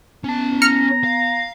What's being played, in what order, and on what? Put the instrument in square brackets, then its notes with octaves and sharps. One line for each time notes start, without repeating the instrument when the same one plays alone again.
[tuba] B3 [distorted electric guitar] C#4 A5
[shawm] A#5 [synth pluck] F6 C#7
[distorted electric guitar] F5